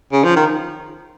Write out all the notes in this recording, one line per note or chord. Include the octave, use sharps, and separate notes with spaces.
C#3
F3
D#3